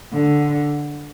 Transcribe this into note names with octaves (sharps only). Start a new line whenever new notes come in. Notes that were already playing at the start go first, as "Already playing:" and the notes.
D3